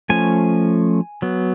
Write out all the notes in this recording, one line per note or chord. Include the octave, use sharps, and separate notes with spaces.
F3 A3 C#4 G#5
F#3 B3